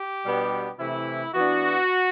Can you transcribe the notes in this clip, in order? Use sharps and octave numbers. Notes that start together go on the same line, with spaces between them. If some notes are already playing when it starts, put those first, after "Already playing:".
Already playing: G4
B2 G3 B3 D4
C3 E3 A3 E4
E3 B3 D4 F#4